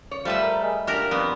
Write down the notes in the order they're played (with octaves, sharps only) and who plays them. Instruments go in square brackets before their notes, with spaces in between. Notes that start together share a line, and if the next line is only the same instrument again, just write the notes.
[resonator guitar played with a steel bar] C#5
[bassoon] F3 [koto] G3 B4 E5 [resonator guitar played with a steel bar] A3
[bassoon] A#4
G#3
[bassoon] A#2 [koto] D4 G4 A#4
[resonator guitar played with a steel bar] F2 [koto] B3